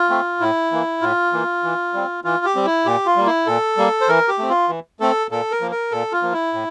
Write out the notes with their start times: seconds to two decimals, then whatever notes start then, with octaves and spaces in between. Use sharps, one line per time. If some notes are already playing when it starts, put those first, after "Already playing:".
Already playing: F4
0.10 A3 C4
0.40 A2 E4
0.72 E3 A#3
1.01 A2 F4
1.32 E3 A#3
1.63 E3
1.94 G3 C4
2.24 E3 F4
2.45 G4
2.55 G3 C4
2.66 E4
2.85 A#2 G4
3.06 F4
3.16 G3 A#3
3.26 E4
3.46 A#2 A4
3.77 G3 A#3
4.01 C5
4.09 E3 A#4
4.28 G4
4.39 A3 C4
4.50 F4
4.69 E3
5.00 A3 C4 A4
5.31 A#2 A4
5.52 A#4
5.61 F3 A#3
5.71 A#4
5.91 A#2 A4
6.12 F4
6.22 F3 A#3
6.33 E4
6.53 A2